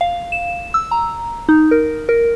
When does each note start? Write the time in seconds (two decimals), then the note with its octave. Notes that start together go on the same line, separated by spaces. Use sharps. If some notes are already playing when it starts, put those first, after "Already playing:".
0.01 F5
0.32 E7
0.74 E6
0.91 A#5
1.49 D#4
1.71 A#4
2.09 A#4